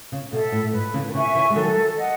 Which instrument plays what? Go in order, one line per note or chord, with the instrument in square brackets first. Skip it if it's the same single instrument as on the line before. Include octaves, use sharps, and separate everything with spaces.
[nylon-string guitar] C#3
[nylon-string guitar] B2 [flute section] A4 E5
[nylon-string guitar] A2
[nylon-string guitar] G#2 [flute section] B4
[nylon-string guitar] C#3 E3
D#3
[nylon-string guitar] C#3 E3 [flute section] E5 G#5 C#6
[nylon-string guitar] C#3 E3
G#3
[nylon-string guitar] D#3 F#3 [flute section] A4
[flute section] D#5 F#5